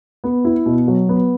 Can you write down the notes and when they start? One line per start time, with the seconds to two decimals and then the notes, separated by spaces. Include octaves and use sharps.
0.24 B3
0.45 E4
0.66 B2
0.88 F#3
1.09 B3